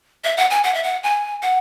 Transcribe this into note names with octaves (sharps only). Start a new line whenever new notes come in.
E5
F#5
G#5
F#5
E5
F#5
G#5
F#5